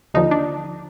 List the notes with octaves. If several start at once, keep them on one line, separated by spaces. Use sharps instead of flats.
D#2 D3 F3 D#4
D4